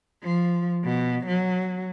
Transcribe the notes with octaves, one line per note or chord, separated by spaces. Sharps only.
F3
B2
F#3